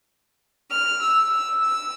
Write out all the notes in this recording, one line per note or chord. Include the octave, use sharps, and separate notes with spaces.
F6
E6
E6